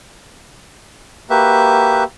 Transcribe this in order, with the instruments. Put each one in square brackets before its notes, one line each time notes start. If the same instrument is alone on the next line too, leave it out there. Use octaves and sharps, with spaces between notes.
[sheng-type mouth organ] A#3 F#4 G4 B4 E5